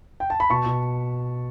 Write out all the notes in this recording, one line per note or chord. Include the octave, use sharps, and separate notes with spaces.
G5
A5
B5
B2 A5 C#6
B2